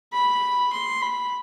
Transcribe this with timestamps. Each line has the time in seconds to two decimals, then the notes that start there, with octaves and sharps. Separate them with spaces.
0.13 B5
0.72 C6
1.02 B5